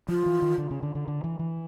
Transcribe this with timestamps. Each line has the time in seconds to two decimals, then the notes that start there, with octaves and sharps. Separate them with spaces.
0.09 F3 F4
0.26 E3
0.42 D#3
0.58 D3
0.71 C#3
0.83 D3
0.95 D3
1.08 D3
1.24 E3
1.39 E3